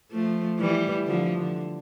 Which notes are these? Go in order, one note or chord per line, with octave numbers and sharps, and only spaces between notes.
F3 A3
E3 G3
D3 F3
D3